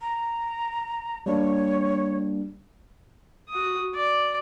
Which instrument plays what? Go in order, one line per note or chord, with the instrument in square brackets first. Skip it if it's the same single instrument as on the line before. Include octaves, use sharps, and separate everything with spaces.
[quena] A#5
[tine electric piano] G3 A#3 D4 [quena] C#5
[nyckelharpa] F#4 D#6
D5